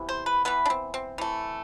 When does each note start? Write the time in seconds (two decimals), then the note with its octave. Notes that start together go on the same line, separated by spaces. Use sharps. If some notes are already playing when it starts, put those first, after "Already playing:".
Already playing: C3 E3 B3
0.09 C5
0.26 B4
0.45 E3 B3 B4
0.66 D4
0.70 C4
0.94 C4
1.18 E3 A3